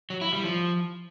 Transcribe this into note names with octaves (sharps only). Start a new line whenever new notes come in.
F#3
E4
G3
F3